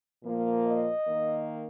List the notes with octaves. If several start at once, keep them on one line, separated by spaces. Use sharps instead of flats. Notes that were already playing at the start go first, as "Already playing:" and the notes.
A#2 F3 A#3
D#5
D#3 A#3